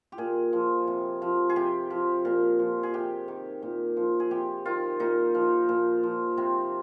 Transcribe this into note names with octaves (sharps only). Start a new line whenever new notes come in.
G4
A#2 G#4
F3
C3
F3
G#4
C3 G4
F3
A#2
F3
G#4
C3 G4
D#3
A#2
F3
G#4
C3 G4
D#3 F4
A#2 D#4
F3
A#2
F3
C3 C4